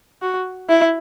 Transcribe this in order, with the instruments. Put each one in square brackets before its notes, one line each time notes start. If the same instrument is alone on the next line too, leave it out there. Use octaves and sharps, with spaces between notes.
[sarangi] F#4
E4